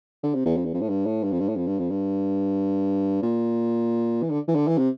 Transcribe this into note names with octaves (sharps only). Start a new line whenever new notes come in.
D3
C3
E2
F2
E2
F2
A2
G2
A2
G2
F2
G2
A2
F2
G2
F2
G2
A#2
E3
D3
E3
D3
E3
C3